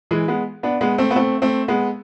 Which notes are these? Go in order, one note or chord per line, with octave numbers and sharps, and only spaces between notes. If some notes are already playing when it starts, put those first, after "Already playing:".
E3 G#3
G#3 B3
B3 D4
G#3 B3
A3 C4
B3
A3 C4
A3 C4
G#3 B3